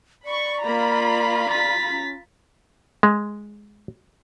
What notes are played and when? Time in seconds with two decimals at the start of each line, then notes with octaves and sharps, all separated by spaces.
0.25 D5 B5 C#6
0.65 A#3 F4 A#5 B5
1.49 A6 B6
1.89 C#4
3.03 G#3